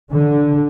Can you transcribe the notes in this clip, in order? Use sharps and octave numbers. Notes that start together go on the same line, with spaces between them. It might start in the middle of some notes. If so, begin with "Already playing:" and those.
D3